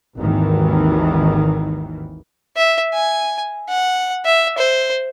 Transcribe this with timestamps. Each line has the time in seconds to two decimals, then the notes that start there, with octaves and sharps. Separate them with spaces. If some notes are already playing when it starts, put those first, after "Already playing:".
0.17 G#1 D#2 D#3 E3
2.56 E5
2.94 G#5
3.70 F#5
4.25 E5
4.58 C5